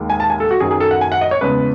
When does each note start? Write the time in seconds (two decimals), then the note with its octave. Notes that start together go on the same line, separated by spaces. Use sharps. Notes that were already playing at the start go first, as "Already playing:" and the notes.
Already playing: D#2 D#3 G#3
0.10 G#5
0.20 A5
0.30 G#5
0.40 A4
0.51 F#4
0.60 F#2 D#3 F#3 G#4
0.71 G#4
0.80 A4
0.91 F#5
1.01 G#5
1.12 F#5
1.21 D#5
1.31 C#5
1.41 E2 C#3 G#3 B4